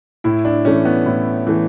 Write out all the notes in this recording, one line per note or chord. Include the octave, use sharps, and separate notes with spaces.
A2 E4
D4
E3 A3 C#4
B3
A2
E3 A3